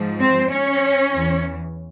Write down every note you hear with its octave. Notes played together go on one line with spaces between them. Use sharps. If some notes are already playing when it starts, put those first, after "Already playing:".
Already playing: G#2 F3
C4 C5
C#4 C#5
E2 E3